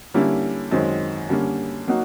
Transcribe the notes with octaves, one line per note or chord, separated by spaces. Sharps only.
D3 G3 A#3 C#4 E4
F#2 D#3 G#3 C4
D3 G3 A#3 C#4
F#3 A#3 D#4 F#4